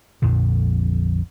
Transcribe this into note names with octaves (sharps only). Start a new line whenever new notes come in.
A#1 F2 A#2 D3